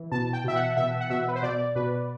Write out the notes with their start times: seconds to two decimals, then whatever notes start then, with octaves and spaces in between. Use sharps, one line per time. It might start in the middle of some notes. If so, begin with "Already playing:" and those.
Already playing: E3
0.12 B2 A5
0.33 G5
0.44 B2 E5
0.56 F#5
0.77 B2 E5
1.00 F#5
1.10 B2 E5
1.28 B4
1.35 C5
1.43 B2 D5
1.75 B2 B4